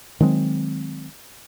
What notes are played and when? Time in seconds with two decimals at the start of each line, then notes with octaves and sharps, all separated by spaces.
0.20 D#3 F#3 G#3 C4